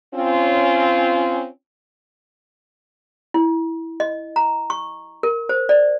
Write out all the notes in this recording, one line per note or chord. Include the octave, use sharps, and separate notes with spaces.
C4 C#4 F4
E4
D#5
A#5
C#6
A#4
C5
D5